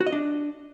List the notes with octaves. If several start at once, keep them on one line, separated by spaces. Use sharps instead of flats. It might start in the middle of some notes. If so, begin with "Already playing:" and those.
F#4
D#5
D4